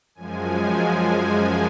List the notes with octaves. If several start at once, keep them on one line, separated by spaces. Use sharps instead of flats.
F#2 F3 G#3 G#5